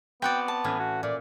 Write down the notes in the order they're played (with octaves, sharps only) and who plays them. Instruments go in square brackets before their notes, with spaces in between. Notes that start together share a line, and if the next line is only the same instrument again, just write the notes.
[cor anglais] B3 [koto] C4 F#4 D5 [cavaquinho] G5
[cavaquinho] A5
[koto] A2 E3 C#4
[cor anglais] F#4
[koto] A#2 [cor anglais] D5